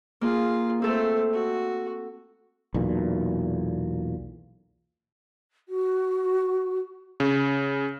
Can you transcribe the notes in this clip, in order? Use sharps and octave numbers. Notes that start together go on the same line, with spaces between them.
A#3 F4 G#4
A3 C4 A4 C5
F#4
B1 E2 A#2
F#4
C#3